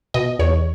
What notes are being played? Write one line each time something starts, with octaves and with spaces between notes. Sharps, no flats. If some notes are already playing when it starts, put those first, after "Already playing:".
B2 D#5
E2 C#5